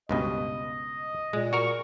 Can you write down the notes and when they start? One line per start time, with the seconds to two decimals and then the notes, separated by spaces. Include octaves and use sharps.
0.09 C#2 G2 B2 D#5
1.33 A#2 G#3
1.53 F#4 A#4 C#6